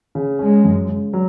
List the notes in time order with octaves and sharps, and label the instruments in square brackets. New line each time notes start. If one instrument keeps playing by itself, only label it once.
[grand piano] C#3
[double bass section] G#3 [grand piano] C#4
[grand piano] F#2
C#3
F#3